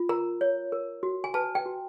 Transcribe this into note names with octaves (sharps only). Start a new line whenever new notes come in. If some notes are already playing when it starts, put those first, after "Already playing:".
Already playing: F4
A#4 A#5
C#5
A#4
F#4
G#5
B4 A5
G5
F#4